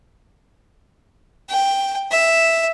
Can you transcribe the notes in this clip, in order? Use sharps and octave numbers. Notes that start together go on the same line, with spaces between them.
G5
E5